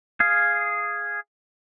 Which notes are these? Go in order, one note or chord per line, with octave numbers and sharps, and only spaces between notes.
G#4 F5